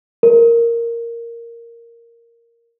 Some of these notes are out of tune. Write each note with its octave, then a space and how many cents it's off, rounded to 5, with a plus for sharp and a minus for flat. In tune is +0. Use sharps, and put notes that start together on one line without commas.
A#4 -5